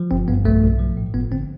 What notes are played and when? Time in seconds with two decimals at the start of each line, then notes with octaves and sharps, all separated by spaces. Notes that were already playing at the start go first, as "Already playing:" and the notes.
Already playing: F3
0.11 G1 C4
0.28 G2 B3
0.45 B1 A3
0.63 B1
0.79 F3
0.97 A2
1.13 G1 B3
1.32 D3 C4